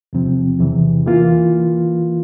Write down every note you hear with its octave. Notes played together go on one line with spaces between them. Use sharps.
E2 C3 F3 C4
E2 C3 E3
E3 A#3 F4